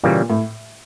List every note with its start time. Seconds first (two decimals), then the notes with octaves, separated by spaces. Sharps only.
0.04 A#2 C#3 E3 G3 A#3
0.30 A2